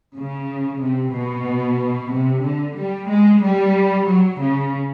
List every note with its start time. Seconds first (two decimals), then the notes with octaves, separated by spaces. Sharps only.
0.17 C#3
0.82 C3
1.15 B2
2.13 C3
2.45 D3
2.77 G3
3.10 G#3
3.43 G3
4.08 F#3
4.41 C#3